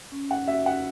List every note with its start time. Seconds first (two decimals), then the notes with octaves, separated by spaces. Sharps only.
0.12 C#4
0.31 F#5
0.48 F#4 E5
0.66 F#5